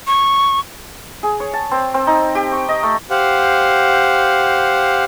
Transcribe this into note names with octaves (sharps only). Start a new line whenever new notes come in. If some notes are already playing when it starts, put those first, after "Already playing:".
C#6
G#4
C#5
A5
C4
C4
D#4
G4
C#6
D#5
A3
G4 C5 F5 F#5